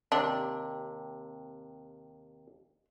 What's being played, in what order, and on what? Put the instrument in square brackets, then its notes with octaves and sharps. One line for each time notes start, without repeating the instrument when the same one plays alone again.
[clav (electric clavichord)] D#2 C3 [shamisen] D4